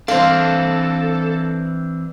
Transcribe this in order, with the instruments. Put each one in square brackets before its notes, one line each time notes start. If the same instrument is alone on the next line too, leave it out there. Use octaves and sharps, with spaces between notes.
[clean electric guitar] E3 C4 D4 [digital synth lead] A4 [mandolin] C5 F5